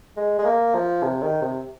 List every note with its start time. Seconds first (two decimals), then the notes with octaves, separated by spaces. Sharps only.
0.17 G#3
0.39 G#3
0.46 A#3
0.74 F3
1.03 C3
1.22 D#3
1.42 C3